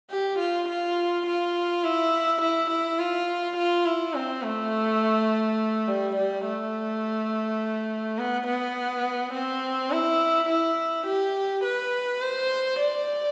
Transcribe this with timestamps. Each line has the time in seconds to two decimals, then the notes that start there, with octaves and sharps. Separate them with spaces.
0.11 G4
0.39 F4
0.69 F4
1.27 F4
1.84 E4
2.41 E4
2.71 E4
2.99 F4
3.57 F4
3.85 E4
4.14 C4
4.43 A3
5.88 G3
6.16 G3
6.45 A3
8.18 B3
8.47 B3
9.34 C4
9.91 E4
10.49 E4
11.07 G4
11.65 B4
12.22 C5
12.80 D5